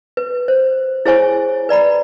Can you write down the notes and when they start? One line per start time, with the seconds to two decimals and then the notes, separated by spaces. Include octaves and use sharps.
0.17 B4
0.48 C5
1.05 E4 G#4 C5 C#5 G#5 C#6
1.69 B4 D5 A#5 B5